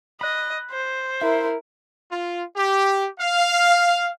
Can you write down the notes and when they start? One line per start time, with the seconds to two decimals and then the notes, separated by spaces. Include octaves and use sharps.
0.21 D#5 B5 F#6
0.71 C5
1.22 E4 A#4 E5
2.11 F4
2.57 G4
3.20 F5